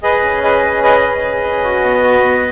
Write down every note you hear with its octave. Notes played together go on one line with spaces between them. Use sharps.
G#4 B4 D#5
C#4
G#4 B4 D#5
C#4
G#4 B4 D#5
C#4
G#4
C#4
F#4
B3
F#4
B3